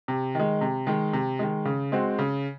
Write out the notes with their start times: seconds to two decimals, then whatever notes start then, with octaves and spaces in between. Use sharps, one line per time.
0.08 C3
0.35 D#3 G#3
0.61 C3
0.87 D#3 G#3
1.13 C3
1.39 D#3 G#3
1.65 C#3
1.92 G#3 C4 F#4
2.19 C#3